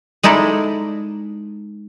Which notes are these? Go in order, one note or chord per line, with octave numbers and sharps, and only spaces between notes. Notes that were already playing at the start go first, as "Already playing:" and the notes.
G#3 D#4 E4 A4 D5